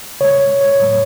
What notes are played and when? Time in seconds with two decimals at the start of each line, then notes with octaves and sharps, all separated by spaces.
0.20 C#3 G#3 C#5
0.61 C#5
0.80 A2 F#3 A3